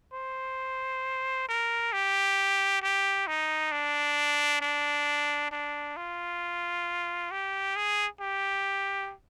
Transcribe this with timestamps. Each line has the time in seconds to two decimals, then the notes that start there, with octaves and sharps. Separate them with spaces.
0.13 C5
1.49 A#4
1.93 G4
2.82 G4
3.27 D#4
3.72 D4
4.61 D4
5.51 D4
5.97 F4
7.31 G4
7.76 G#4
8.21 G4